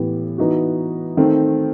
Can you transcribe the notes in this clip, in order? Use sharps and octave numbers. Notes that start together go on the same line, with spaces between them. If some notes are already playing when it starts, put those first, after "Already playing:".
Already playing: A2 E3 B3 E4 G4
E3 B3 D#4 F#4
D#3 A3 C4